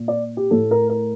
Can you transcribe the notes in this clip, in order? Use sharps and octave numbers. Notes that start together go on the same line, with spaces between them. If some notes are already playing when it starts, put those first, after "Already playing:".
Already playing: A#2
D5
G4
A2 A3 A4
A#4
A#4